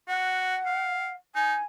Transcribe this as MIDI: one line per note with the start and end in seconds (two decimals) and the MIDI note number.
0.08 0.56 66
0.08 1.12 78
0.66 1.11 77
1.35 1.55 63
1.35 1.62 80